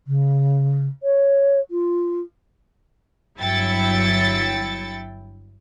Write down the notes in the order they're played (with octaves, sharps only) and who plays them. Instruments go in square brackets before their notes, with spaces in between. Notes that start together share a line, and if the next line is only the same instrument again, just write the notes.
[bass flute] C#3
C#5
F4
[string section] G1 F#3 E4 G5 A6 C#7